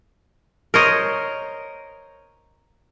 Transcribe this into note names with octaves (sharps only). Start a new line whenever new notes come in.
A#4 C5 C#5 D#5